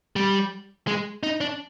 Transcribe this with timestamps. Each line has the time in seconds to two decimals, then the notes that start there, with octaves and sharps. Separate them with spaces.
0.16 G3
0.87 G#3
1.23 D#4
1.41 D4